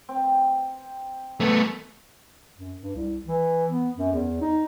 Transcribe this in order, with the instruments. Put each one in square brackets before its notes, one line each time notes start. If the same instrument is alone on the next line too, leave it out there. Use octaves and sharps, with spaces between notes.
[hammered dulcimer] C4
[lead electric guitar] A3 B3
[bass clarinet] F#2
G2
C2
E3
B3
F#2
E2
D#4